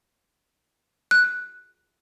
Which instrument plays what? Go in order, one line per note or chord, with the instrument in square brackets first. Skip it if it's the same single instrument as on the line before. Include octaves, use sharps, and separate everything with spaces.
[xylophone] F#6